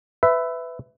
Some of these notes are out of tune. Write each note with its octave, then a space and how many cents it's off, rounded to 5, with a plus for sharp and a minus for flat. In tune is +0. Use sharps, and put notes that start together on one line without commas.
B4 +20 E5 +0